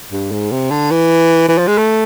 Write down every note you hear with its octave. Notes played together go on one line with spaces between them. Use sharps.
G2
G#2
C3
D3
E3
E3
F3
G#3
A3